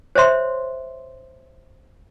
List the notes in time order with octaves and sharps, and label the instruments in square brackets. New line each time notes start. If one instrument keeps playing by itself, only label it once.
[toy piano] C5 C#5 E5 C6